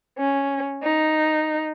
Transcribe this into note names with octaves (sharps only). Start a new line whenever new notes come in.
C#4
D#4